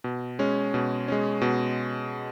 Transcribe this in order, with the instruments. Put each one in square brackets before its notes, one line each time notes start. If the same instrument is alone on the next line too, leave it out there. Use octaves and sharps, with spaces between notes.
[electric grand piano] B2
G#3 C#4
B2
G#3 C#4
B2